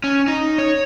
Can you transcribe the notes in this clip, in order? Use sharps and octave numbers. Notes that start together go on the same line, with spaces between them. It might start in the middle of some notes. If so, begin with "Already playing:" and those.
C#4
D#4
C#5